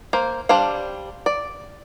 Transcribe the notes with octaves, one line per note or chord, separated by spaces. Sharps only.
A#3 C5
G3 D4 C5 F5
D5